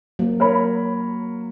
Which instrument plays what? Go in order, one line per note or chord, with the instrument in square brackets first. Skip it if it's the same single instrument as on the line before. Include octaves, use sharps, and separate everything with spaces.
[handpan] F#3 A#3
[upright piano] A#4 C#5 B5